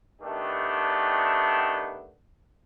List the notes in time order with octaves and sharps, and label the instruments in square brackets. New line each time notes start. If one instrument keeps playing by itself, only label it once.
[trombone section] D#3 A3 B3 D4 G4